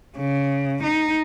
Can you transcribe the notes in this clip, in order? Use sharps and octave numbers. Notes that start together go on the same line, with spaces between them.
C#3
D#4